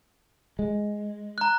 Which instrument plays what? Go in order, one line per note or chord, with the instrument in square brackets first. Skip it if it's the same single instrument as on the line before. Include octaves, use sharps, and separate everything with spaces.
[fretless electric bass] G#3
[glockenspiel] A#5 F#6